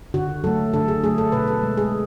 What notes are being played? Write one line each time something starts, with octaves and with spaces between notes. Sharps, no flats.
D3 F#4
F#3 A3 A4
D3 A4
G#4
F#3 A3 G#4
A4
B2 B4
A4
G#3
G#4